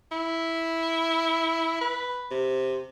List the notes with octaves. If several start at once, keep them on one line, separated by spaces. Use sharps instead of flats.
E4
B4
C3